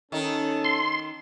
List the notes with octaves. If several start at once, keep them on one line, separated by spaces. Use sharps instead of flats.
D#3 C#4 D#4 A4
C6